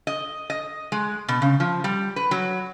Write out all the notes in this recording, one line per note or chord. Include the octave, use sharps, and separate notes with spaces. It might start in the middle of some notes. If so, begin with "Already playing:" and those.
D#5
D#5
G#3
B2
C#3
F3
G3
B4
F#3